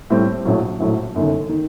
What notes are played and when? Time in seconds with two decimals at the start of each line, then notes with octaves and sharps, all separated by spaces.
0.10 A2 G3 C4
0.45 A#1 A2 F#3
0.80 A#1 A2 F#3
1.15 G1 F#2 D#3
1.49 D#3